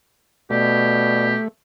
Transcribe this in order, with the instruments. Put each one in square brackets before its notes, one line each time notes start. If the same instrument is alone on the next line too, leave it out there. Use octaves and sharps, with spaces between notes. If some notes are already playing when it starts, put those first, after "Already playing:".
[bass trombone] B2 [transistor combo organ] A3 [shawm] G4 [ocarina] D5